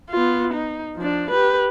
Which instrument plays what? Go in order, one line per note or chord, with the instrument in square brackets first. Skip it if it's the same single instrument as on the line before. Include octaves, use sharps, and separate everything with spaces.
[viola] B3 F4
D#4
F3 D4
G4 B4